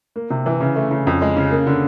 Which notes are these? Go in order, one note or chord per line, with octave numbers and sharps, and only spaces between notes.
A#3
C3
E3
C#3
A3
C#3
F2
G#3
C#3
A#3
D3